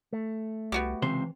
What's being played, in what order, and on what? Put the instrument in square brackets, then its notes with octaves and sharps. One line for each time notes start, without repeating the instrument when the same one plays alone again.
[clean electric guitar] A3
[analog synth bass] C2 [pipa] B3 F#4 G4
[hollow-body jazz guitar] C#2 C3 C5 [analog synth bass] E3